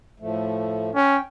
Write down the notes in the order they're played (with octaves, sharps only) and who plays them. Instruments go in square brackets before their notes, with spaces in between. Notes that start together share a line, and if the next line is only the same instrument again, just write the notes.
[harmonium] A2 F3 A3
[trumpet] C#4 [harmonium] G5